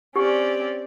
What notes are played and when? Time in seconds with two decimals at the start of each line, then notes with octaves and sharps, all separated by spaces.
0.16 C4 C#4 G4 D5